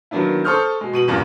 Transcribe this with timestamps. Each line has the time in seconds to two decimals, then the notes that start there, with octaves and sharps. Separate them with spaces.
0.11 D#3 F#3 A#3 B3 D4 E4
0.44 A4 C5 C#6 D#6 F6 G6
0.81 B2 G#3
0.93 B2 D#7 F#7
1.08 E2 G2 A#2 C#3 E3